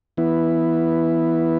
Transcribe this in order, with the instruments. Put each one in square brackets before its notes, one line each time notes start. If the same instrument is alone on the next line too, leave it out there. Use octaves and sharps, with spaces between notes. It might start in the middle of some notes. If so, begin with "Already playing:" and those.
[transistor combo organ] E3 B3 E4